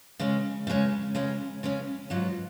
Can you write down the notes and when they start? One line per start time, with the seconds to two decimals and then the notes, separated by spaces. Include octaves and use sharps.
0.19 C#3 G#3 C#4
0.67 C#3 G#3 C#4
1.15 C#3 G#3 C#4
1.63 C#3 G#3 C#4
2.10 G#2 F#3 B3 F4